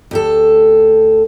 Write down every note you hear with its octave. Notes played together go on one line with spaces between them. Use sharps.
D2 G4 A4